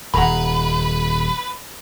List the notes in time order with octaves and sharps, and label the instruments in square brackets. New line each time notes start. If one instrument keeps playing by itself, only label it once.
[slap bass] D#1 [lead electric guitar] B4 [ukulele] F#5 A#5 B5